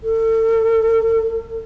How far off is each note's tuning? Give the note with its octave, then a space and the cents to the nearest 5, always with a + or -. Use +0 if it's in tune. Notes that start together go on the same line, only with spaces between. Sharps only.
A4 +40